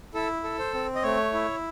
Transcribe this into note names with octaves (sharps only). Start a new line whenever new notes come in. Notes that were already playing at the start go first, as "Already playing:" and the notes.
E4 A4
A4
C5
C4
D#5
A3 C#5
E4